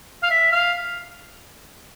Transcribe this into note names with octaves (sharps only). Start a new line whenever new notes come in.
F5
E5
F5